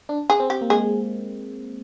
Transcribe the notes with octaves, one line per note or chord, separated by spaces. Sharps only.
D4
G#4
C4
G4
A#3
G#3 G#4